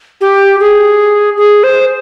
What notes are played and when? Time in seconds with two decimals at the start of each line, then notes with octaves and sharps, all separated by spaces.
0.21 G4
0.60 G#4
1.37 G#4
1.63 C5